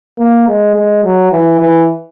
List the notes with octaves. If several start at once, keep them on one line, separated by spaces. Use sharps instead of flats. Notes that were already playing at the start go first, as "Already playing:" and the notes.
A#3
G#3
G#3
F#3
E3
E3